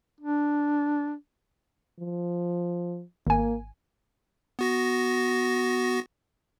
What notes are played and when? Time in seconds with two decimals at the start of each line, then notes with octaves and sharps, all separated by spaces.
0.20 D4
2.00 F3
3.27 G#1 A#3 G#5
4.59 B3 F#4 A#6